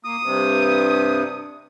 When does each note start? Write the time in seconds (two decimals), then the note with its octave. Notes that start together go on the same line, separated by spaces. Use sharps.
0.05 A#3 D#6
0.23 G2 C3